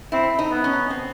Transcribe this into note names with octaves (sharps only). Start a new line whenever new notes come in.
C4 E4
D#4
B3
C#4
C4